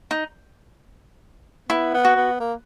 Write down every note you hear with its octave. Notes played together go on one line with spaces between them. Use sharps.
D#4
B3 E4
B3
F#4
B3
A#3